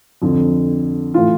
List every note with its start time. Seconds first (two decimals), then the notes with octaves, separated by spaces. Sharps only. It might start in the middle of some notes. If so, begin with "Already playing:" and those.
0.22 F2 D3
1.14 A2 E3 F4